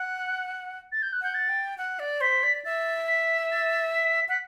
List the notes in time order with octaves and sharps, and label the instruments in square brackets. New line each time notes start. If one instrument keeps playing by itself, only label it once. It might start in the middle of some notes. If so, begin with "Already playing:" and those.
Already playing: [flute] F#5 [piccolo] F#6
[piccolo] A6
G6
F#6
[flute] F#5 [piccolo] G6
[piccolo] A6
[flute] G5
F#5
D5
[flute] C5 [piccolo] B6
[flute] D5
[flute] E5 [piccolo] A6
[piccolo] B6
A6
B6
[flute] F#5 [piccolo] B6